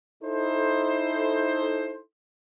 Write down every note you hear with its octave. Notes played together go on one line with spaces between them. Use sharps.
D#4 E4 A4 C5